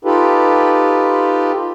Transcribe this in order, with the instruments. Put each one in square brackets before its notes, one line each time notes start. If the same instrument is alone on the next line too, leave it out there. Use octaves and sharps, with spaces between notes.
[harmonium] D#4 F4 G4 A4 B4